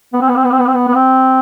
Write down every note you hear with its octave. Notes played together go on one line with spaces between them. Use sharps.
B3
C4
B3
C4
B3
C4
B3
C4
B3
B3
C4